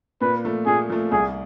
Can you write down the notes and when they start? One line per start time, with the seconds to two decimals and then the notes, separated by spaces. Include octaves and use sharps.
0.21 A#2 B4
0.45 F3 A3
0.66 A#2 G#4
0.90 F3 A3
1.12 C2 G#4